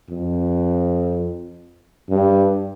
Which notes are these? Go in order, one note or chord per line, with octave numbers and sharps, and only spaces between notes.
F2
G2